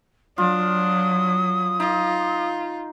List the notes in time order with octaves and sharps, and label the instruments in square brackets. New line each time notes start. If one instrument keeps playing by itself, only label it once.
[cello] F#3 [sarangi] D4 [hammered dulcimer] F4 [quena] D#6
[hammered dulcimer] D#4 [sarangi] F4